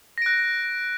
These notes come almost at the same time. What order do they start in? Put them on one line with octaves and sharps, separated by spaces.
A#6 D7 F#6